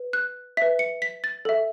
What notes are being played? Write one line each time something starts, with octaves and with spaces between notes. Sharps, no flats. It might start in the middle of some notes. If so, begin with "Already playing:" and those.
Already playing: B4
F#6
B4 E5 B6
C#7
B6
A6
A4 E5